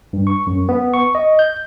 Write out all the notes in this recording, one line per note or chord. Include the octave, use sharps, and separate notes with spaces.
G2
C#6
F#2
B3
C#6
D#5
G6